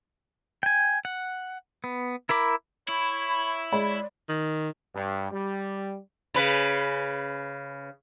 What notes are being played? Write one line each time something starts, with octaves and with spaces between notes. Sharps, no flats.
G5 G#5
F#5
B3
E4 A#4 B5 D6
E4 C#5 B5
G#3 C#5 D5 B5
D#3
G2
G3
C#3 B4